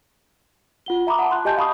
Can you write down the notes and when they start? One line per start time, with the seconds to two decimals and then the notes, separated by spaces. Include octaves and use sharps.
0.86 F4 F#5 G7
1.07 E5 A#5 B5 D6 D#6
1.19 F#5 A5
1.31 C6 F#6
1.45 G4 D#5 G#5 A5 G6
1.57 F5 B5 C#6 D#6 C7